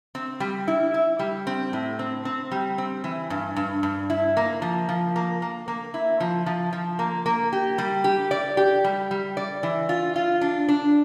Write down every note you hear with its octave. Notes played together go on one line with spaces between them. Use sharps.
C4
G3
E4
E4
G3
C4
A2
C4
C4
G3
C4
E3
G2
G2
G2
E4
A#3
F3
F3
A#3
A#3
A#3
E4
F3
F3
F3
A#3
A#3
G4
G3
G4
D5
G4
G3
G3
D5
E3
F4
F4
D4
D4